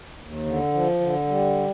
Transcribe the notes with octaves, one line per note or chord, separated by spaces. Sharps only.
D#2
D3
F3
D3
G3